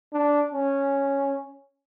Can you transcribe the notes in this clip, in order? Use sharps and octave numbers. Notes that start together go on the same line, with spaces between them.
D4
C#4